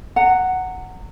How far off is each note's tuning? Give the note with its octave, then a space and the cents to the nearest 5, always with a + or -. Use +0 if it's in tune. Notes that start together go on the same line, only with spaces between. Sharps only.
F#5 +0 A#5 -25